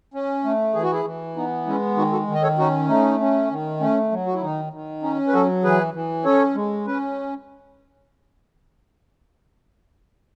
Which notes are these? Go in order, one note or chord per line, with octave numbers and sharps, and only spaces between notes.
C#4
A3
E3 G#4
F#4
E4 G#4
E3
B3 D#4
G#3 C#4 E4
D#3 D#4 F#4
F#4 A4
D#3
D#5
A4 C#5
C#4 D#4 F#4
A3 D#4
C#4
D#3
A3 C#4
F#3
F#4
E4
D#3 D#4
D#3
C#4 D#4
B4
F#3 F#4 A4
E3 G#4 B4
E3
C#4 A4 C#5
G#3
C#4 B4